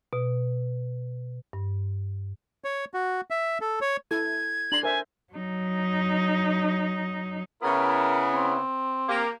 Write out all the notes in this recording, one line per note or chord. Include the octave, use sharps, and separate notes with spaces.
B2
G2
C#5
F#4
E5
A4
C#5
E4 A4 G#6
D4 A#5 C6 F#7
A#4 C5 E5 G#5
F#3 D#4
C#3 B3 E4 A#4
C4
A#3 G4